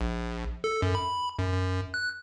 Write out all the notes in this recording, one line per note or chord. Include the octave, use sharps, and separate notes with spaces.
A#1
A4
F#2
B5
F#2
F#2
F#6